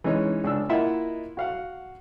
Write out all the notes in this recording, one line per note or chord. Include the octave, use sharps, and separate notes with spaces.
E3 G#3 C#4 D#4 C#5
C#2 D4 E6
A#3 E4 F4 D#5 E5 F#5
F#4 F5 F#5